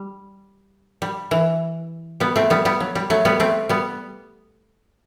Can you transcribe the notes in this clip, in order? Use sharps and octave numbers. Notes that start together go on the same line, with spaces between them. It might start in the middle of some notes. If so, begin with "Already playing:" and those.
Already playing: G3
G3
E3
G3 B3
A3 C4
G3 B3
G3 B3
F#3
G3
F#3 A3
G3 B3
A3 C4
G3 B3